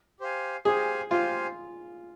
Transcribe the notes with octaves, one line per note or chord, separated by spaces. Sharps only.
G4 C5 F5 G#5
G4 G#4 C5 F5 G#5
F4 G4 C5 F5 G#5